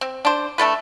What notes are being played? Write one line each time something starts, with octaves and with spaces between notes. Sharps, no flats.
C4
D4 C5
A3 D4 A4 B4